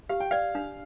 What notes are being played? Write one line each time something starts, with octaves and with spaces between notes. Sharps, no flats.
G4 F5
G5
D5 F5
D4